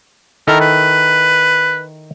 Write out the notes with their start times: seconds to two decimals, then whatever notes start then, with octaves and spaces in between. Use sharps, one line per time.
0.48 D#3 E4 A4 A#4
0.61 B4